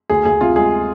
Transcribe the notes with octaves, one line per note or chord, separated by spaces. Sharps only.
D2 G#4
D2 G#4
C3 F4
G#3 G#4